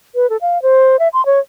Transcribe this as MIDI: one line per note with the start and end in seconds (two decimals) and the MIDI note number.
0.15 0.29 71
0.30 0.37 69
0.41 0.61 77
0.62 0.99 72
0.99 1.08 76
1.13 1.24 84
1.26 1.39 73